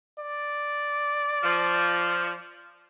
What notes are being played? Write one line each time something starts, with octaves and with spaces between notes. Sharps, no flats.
D5
F3